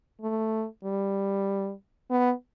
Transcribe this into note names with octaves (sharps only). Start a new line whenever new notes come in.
A3
G3
B3